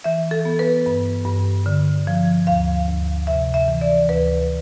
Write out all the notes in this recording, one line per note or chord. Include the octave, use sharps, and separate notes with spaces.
E3 E5
A4
B3
B4
G2
G2
D3
F3
D2 F5
D2
C3 E5
E5
E3
D5
D2 B4